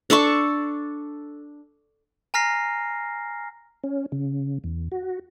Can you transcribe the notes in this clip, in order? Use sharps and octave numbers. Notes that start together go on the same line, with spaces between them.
D4 A4 A5 C#6
G#5 A#5 F6 A#6 C7
C#4
C#3
E2
F#4